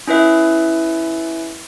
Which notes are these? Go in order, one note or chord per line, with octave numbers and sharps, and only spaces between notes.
C#4 E4 B4 E5